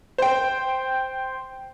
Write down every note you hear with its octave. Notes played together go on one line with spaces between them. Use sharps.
C5 G5